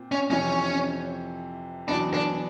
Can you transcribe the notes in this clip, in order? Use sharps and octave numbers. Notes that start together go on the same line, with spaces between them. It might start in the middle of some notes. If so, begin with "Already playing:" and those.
Already playing: A#2 C4
C#4
F2 C3 E3 C#4
E2 B2 F#3 B3 D4
D4